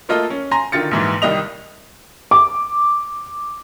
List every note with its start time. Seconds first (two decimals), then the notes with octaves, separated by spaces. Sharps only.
0.09 A3 A#3 F4 A4 D#5
0.30 C#4
0.51 G#5 A#5 C6 A#6
0.72 D3 D#3 F4 A6 C#7
0.91 A#1 G#2 E3
1.22 C2 D#3 G3 D#5 D#6 F7
2.31 D6